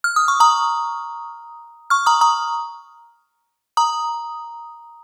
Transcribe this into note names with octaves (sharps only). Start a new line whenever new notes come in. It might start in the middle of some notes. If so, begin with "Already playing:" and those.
F6
D#6
C#6
A#5 D#6
C#6 F6
A#5 D#6
A#5 D#6
A#5 D#6